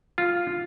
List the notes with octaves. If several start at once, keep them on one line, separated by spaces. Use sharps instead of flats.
F4